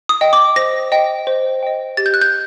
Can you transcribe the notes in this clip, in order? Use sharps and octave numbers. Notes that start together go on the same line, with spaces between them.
D#6
D#5 G5
D6
C5 A#6
D#5 G5
C5
D#5 G5
G4 A6
G6
F#6
G6